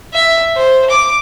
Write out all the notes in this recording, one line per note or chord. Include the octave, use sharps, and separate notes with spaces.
E5
C5
D6